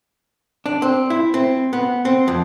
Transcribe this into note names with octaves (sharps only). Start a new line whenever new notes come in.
D4
C4
E4
C4
B3
C4
F2